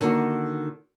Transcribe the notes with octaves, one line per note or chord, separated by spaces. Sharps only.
D3 D#3 A#3 D#4 F#4